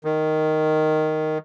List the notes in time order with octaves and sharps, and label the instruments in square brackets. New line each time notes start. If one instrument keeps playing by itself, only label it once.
[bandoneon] D#3